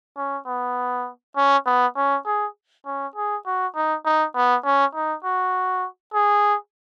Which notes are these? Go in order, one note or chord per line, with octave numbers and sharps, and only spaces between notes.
C#4
B3
C#4
B3
C#4
G#4
C#4
G#4
F#4
D#4
D#4
B3
C#4
D#4
F#4
G#4